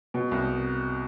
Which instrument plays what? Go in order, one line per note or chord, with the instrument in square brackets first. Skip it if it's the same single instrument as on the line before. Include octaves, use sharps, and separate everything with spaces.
[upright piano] B2
C2